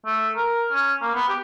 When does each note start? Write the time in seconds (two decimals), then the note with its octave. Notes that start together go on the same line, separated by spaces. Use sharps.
0.05 A3
0.36 A#4
0.73 C#4
1.02 A#3
1.15 B3
1.28 G4